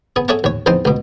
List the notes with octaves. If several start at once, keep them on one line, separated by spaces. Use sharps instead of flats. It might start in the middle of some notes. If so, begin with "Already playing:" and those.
B3 G#4
G#4 A4 C#5 E5 F#5 A5
D#2 C#5
E2 F3 C4 D#4 C5 C6
C#2 B2